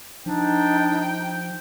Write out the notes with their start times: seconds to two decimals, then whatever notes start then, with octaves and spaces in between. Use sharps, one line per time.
0.26 F3 D4 D#4 G5